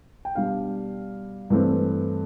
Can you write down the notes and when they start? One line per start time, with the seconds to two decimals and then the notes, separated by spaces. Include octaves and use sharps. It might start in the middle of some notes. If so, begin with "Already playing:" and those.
0.25 G5
0.35 B2 G3 D4 F5
1.50 G2 E3 A3 C4